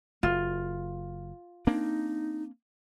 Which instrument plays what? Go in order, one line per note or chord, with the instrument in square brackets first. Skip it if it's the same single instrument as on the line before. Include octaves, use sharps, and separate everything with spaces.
[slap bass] F#1 [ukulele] F4
[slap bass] A#3 C4 D4 [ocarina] D#4